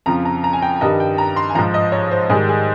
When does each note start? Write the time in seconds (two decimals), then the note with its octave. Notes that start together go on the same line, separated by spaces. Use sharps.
0.06 F2 C#3 F3 A#5
0.25 A#5
0.44 A#5
0.53 G#5
0.62 G5
0.81 G2 D#3 G3 D#5
1.00 G5
1.18 A#5
1.36 C6
1.49 G#5
1.55 F3 A#5
1.59 G#2
1.74 D#5
1.92 C#5
2.11 C5
2.29 G#2 D#3 G3 G#4
2.48 G#4